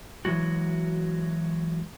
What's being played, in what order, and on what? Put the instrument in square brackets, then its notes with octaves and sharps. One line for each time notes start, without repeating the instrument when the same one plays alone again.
[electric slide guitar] E3 F#3 G#3 F#4